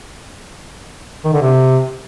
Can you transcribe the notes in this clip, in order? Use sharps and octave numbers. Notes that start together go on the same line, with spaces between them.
D#3
D3
C3